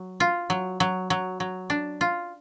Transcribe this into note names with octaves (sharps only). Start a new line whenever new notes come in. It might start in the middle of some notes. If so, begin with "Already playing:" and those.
Already playing: F#3
F4
F#3
F#3
F#3
F#3
D4
F4